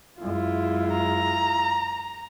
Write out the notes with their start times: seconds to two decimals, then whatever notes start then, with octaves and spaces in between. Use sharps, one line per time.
0.20 F#2 G#3 E4 F4
0.91 A#5